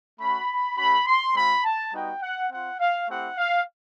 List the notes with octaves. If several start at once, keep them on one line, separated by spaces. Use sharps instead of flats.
A3 C#4 F#4 B5
A3 C#4 F#4 B5
C6
G#3 C4 F4 B5
A5
G3 B3 D#4 F#4 G5
F#5
C4 F4 F#5
F5
A3 C4 E4 G4 F#5
F5